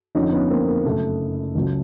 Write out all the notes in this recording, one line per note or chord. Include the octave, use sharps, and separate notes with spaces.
F2 D3 F3 C#4 D#4
B3 C#4
A#3 C4
A#3
F#1 F#2 C#3 A3
C#2 C#3 F#3